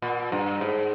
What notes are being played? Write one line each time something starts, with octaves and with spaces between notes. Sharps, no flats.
A#2
G2
G#2